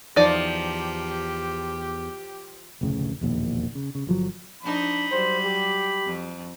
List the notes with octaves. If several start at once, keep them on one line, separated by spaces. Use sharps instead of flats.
E2 F3 D#4 G4 D5
F1 D2 A2 C#3
E1 A#1 D#2
C#3
C#3
G1 F3 F#3
F3 D4 D#4 B5
F#3 G3 C5
G4
F2